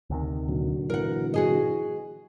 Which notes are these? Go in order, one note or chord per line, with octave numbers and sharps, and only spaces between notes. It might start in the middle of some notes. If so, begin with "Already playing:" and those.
D2 C3 D#3
A#2 D3 F#3
E3 A#4 F#5
F#4 G#4 D#5